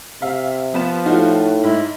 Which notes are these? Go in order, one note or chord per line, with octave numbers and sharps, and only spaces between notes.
C3 E5 F5
F3 B3 B4 E7
A2 G3 D#4 F4 F#4
G#2 E4